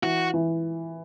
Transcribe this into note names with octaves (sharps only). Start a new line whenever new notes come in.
E3 F#4
E3